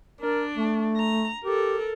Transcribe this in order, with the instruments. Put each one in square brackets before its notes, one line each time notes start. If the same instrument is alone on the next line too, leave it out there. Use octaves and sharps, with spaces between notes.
[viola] D4 [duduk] A#4
[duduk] A3
[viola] A#5
[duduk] G4 [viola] A4 A#4